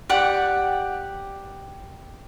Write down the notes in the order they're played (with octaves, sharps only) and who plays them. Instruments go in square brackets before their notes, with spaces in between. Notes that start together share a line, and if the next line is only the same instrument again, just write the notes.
[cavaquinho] G4 D5 F#5 G5